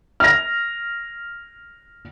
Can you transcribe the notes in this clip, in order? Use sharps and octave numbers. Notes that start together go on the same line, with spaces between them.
F6 A#6